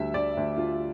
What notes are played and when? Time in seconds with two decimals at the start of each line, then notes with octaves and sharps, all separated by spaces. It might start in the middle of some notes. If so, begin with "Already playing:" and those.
Already playing: D2 G3 E5
0.14 D2 D5
0.37 D2
0.57 D2 F4